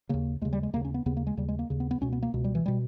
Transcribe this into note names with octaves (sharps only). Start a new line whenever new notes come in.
D#2 C#3 A#3
D#2 C#3 G#3
G3
G#3
D#2 C#3 A#3
C#4
B3
D#2 C#3 B3
A#3
G#3
D#2 C#3 G3
G#3
A#3
D#2 C#3
B3
B3
C#2 B2 C#4
B3
A#3
C#2 B2
G3
E3
B2 G3